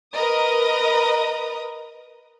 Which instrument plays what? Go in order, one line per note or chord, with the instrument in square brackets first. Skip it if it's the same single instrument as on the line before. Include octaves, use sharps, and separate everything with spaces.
[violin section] A#4 B4 D#5 A#5 D#6